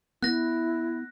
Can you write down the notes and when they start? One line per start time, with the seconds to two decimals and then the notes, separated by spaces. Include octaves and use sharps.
0.23 B3 E4 F#6 A#6